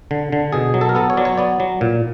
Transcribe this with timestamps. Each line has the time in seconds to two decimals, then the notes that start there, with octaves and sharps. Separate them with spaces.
0.11 D3
0.32 D3
0.53 B2 G#4
0.74 F#3
0.81 A4
0.89 A#4
0.95 B3 A4
1.10 C#5
1.17 F#3 D5
1.25 C#5
1.37 B3 D5
1.60 F#3
1.81 A#2